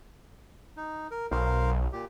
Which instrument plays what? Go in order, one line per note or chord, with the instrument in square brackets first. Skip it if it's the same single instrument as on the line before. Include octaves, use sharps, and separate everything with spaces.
[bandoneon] D#4
A#4
[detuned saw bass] B1 [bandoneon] A#4 C5 F5
[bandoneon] A#2 G4